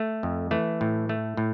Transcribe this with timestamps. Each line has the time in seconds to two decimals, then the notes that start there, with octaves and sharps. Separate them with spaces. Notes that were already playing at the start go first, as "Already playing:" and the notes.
Already playing: A3
0.23 F2
0.51 E3 A3
0.81 A2
1.09 A3
1.37 A2